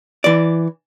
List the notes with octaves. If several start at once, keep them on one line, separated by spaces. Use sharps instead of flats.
E3 D5